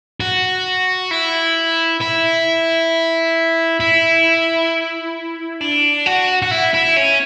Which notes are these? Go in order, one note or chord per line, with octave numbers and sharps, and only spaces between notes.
F#4
E4
E4
E4
D4
F#4
F#4
E4
E4
C#4